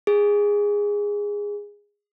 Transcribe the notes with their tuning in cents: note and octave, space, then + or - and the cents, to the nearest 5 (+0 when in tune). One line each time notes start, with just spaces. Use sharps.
G#4 -15